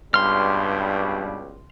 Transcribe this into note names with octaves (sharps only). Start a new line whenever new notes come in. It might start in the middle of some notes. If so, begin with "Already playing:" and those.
C#2 G2 B2 G3 C6 F6